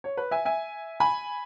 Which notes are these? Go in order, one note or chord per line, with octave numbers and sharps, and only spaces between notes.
C#5
B4
E5 G#5
E5 G#5
G#5 B5